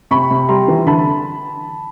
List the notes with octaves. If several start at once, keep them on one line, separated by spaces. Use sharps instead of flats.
C3 B5 C#6
C3
G3 A#5 C6
E3
D3 A5 B5